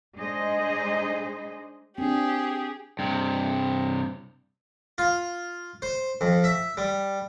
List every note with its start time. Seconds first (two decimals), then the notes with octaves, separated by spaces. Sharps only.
0.18 G#3 D4 D#4 G#4 C5 D#5
1.98 C4 D4 G4 G#4
2.99 G2 C3
4.98 F4
5.82 C5
6.21 F2
6.44 E5
6.77 G3